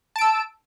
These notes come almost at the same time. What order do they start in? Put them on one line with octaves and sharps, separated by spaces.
A5 D7 E6